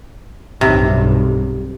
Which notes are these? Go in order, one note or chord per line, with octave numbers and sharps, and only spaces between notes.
B1 G2 C3